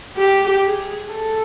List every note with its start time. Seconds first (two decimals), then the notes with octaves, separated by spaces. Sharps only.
0.18 G4
0.64 G#4
1.11 A4